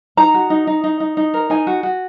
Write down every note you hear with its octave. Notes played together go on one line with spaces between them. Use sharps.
D#4 A#5
F#4
D#4
D#4
D#4
D#4
D#4
A#4
D#4 G#5
F#4
F#4